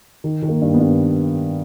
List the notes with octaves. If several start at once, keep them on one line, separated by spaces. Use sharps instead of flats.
D#3
D#3
A#3
G2
B3
G2